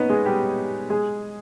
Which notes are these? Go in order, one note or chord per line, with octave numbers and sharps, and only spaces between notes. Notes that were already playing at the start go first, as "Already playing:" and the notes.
Already playing: B3 C#4 D#4 B4 D#5
G#3 G#4
G3 G4
G#3 G#4